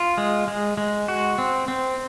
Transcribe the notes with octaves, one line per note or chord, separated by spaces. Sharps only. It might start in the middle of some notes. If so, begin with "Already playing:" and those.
Already playing: F4
G#3
G#3
G#3
F#4
C4
C4